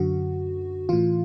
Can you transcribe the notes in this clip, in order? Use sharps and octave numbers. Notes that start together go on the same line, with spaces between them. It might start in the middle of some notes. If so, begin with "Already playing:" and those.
Already playing: F#2 D3 F#4
A2 E3 F4